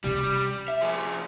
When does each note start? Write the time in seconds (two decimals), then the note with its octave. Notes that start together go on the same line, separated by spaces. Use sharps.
0.04 C3 G3 C#4
0.68 E5
0.82 F3 G#4